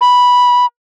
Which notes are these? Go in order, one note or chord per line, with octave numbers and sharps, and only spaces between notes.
B5